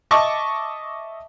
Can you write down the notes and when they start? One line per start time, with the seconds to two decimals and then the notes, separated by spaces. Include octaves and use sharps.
0.11 D#5 E5 A5 C#6 D6